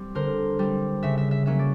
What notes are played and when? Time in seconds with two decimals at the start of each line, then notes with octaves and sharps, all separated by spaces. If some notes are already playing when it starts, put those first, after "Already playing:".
Already playing: G3 C4
0.15 D3 A#4 C5
0.59 G3 C4
1.03 C#3 E5
1.18 E5
1.31 E5
1.46 F#3 A#3 C#4 E5
1.59 D5